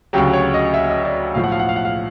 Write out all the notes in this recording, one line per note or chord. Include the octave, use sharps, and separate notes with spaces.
D2 C#3 F#3 G4
C#5
D#5
E5
D#5
D5
B1 A2 F3 F5
F#5
F5
F#5
F5
F#5
F5